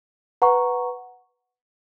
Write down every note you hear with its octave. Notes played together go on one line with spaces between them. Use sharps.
B4 F#5 A#5 C#6